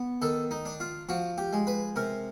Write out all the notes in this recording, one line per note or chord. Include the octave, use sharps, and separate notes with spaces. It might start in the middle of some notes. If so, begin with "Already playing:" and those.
Already playing: B3
D#3 A4
D#4
D4
F4
F3 F#4
G4
G#3
B4
C3 A#4